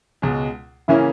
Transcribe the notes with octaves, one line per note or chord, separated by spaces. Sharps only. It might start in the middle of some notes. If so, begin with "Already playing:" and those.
C#2 B2 G#3
C#3 E3 A#3 C#4 E4